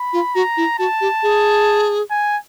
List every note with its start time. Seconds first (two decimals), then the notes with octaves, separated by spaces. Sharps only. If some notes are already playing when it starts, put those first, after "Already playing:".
Already playing: B5
0.13 F4
0.35 F#4 A#5
0.57 E4
0.79 F#4 A5
1.01 G4
1.23 G#4
2.11 G#5